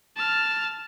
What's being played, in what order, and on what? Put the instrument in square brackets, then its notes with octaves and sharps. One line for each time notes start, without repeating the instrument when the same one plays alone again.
[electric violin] A5 F6